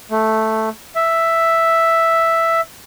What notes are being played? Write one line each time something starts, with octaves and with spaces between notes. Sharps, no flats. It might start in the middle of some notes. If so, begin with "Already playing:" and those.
A3
E5